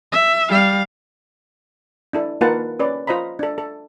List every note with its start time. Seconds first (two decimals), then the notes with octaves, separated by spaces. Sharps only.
0.12 E5
0.49 G3 F5
2.13 D4 E4 A4
2.41 A#3 D#4 F4 B4 F#5 A5
2.79 C#4 B4 D5
3.07 F4 C5 D#5 A#5 B5
3.39 D4 A4
3.58 A4